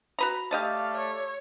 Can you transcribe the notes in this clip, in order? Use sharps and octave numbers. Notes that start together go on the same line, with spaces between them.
F#4 B4 A#5
A3 G4 D5 D#5 F5 A5
C#5